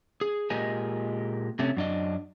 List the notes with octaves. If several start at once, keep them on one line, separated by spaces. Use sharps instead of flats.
G#4
A#2 G#3 G4 A#4 D#5 G#5
C3 A3 C#4
F#2 D4 D#5